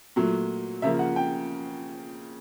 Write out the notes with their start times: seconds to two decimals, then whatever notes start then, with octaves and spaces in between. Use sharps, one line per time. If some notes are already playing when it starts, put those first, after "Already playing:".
0.16 A#2 F#3 A3
0.82 C#3 F3 A#3 E5
0.99 F#5
1.16 G5